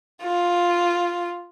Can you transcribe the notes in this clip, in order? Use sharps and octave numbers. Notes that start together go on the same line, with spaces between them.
F4